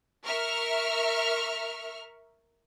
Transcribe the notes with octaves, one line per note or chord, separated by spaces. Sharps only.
A#4 E5 C#6 F6